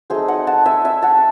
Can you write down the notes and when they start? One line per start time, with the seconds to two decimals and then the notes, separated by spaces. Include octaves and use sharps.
0.10 F#3 A3 C4 D#4 G#4 C5
0.28 D#5 F#5
0.47 F#5 A5
0.66 E5 G#5
0.85 E5 G#5
1.02 F#5 A5